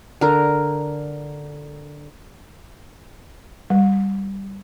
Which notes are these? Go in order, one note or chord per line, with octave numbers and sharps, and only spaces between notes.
D3 A#4
G3